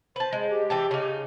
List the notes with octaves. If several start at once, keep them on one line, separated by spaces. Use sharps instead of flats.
B4 C5 A5
G#3
G4
E3 G5 A5
C#3 D#4